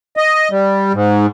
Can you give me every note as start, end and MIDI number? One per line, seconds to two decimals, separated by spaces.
0.17 0.48 75
0.51 0.93 55
0.93 1.26 44